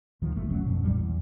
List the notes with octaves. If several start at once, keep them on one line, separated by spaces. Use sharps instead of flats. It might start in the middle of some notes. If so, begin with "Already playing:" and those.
D2 D#3 F3
G1 D2 A3
F#1 B1 F#3 C#4
F2 B2
A#1 F#2 F#3 G3
E2